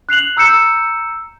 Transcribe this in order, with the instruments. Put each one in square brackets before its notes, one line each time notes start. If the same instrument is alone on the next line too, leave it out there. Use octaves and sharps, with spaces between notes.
[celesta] F#6 C7 F7 F#7
A#5 E6 G6 C#7 E7